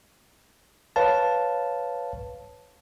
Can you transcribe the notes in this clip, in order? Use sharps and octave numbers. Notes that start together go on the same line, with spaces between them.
B4 C#5 F5 A5